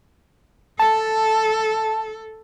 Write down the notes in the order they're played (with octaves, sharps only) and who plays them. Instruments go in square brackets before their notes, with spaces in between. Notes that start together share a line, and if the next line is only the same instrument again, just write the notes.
[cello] A4 [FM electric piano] A5